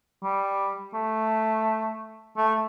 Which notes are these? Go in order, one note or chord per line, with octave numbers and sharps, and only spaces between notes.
G3
A3
A3